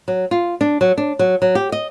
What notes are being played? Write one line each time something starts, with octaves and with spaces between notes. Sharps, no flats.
F#3
F4
D4
F#3
D4
F#3
F#3
G4
D#5